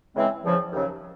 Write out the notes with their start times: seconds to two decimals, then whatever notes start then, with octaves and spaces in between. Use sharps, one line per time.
0.15 C#3 E3 G#3 C4
0.44 E2 C#3 F3
0.73 D#2 C#3 F#3